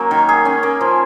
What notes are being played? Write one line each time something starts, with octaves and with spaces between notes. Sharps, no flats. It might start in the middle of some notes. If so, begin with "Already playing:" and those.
Already playing: F#3 A#3 C#4
D#3
G#4
C#4
A#3
F3